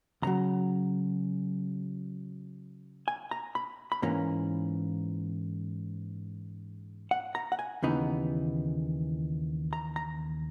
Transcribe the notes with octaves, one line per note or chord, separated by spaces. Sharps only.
D#2 C#3 F#3 A#5
G#5
A#5
B5
B5
G#2 E3 A#3 C#4 A#5
F#5
A#5
F#5
G#5
D#2 C#3 E3 B3 D#4
A#5
A#5